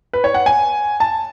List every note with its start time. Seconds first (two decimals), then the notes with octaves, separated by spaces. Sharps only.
0.13 B4
0.24 C#5
0.34 F#5
0.46 G#5
1.00 A5